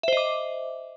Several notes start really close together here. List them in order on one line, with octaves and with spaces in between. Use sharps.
E5 C5 D#5 D6